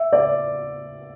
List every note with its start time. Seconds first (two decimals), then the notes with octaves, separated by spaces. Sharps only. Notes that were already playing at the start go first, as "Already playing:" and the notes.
Already playing: E5
0.13 D5